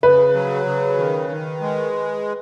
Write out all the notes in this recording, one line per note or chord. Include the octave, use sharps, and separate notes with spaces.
C#3 B4
F#3
C#3
D#3
D#3
G#3